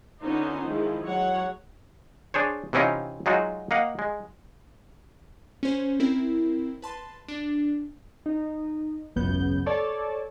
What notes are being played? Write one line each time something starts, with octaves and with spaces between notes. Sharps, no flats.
D3 B3 C#4 D#4 F4 C5
D#3 F3 G#3 E4
F#3 G#3 C#5 F#5
D4 G#4 C5 C#5
C3 E3 C4 C#4 D#4 F4
F#3 G#3 D#4 F4 F#4
A#3 D#5 F5 F#5
G#3
C#4 C5
C4 E4 A#4
B4 A5 C6
D4
D#4
G#1 C#2 F#2 C#3 B3 G6
A4 C#5 D5 A5